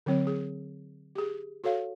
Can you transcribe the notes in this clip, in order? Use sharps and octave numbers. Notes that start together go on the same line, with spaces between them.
D3 F#3 C4 C#5
G#4
G4 G#4
F#4 A4 C#5 F5